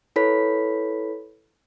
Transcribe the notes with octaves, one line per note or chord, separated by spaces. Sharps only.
E4 A4 B4 C#5 B5 B6